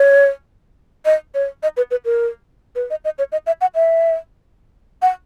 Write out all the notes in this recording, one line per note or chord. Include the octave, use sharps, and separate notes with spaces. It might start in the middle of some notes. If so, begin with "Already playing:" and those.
Already playing: C#5
D#5
C#5
D#5
B4
B4
A#4
B4
D#5
D#5
C#5
D#5
E5
F#5
E5
F#5